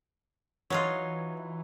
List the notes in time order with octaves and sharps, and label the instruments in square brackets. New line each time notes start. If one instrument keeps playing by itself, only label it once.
[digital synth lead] E3 [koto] F#3 D#4 F4 [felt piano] C#5